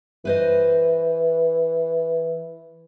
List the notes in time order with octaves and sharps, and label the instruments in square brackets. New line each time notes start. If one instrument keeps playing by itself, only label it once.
[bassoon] E3 [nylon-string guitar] B4 C5 D#5